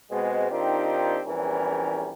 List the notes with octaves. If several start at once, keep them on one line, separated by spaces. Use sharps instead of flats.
B2 G#3 C4
D#3 C4 D4 D#4 F4 G4
A#1 E2 E3 G3 C#4 A#4